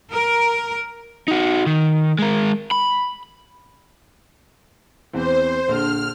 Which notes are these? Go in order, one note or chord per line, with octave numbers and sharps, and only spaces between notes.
A#4
D#4 F#4
D#3
G#3 A#4
B5
E2 E3 C4 C5
A#1 D3 F6